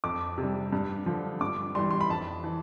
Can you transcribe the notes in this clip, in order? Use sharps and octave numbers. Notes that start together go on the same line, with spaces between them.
F2 D6
C3 G3
G2
D3 F3
G2 D6
E3 G3 C6
C6
B5
F2 A5
E3